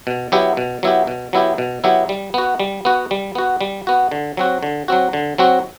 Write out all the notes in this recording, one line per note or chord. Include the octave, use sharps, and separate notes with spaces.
B2
F#3 B3 E4 G4
B2
F#3 B3 E4 G4
B2
F#3 B3 E4 G4
B2
F#3 B3 E4 G4
G3
B3 F#4
G3
B3 F#4
G3
B3 F#4
G3
B3 F#4
D3
F#3 C4 F#4
D3
F#3 C4 F#4
D3
F#3 C4 F#4